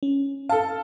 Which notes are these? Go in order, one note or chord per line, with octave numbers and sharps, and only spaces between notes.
C#4
A4 F5 A5